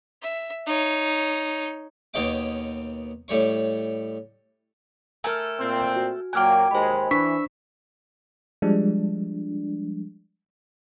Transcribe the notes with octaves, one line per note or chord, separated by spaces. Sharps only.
E5
D#4 C#5
D#2 B2 C#5 D#5 G5 D6
A2 G3 C#5 C#6
A3 A4 A#4 G#5 A#5 F6
A#2 C4
F#4
A#2 F#3 A#3 G5 G#5 D6 F6 F#6
D#2 G#3 C5 B5
E3 D4 E5 C#6 B6
F3 G3 G#3 D4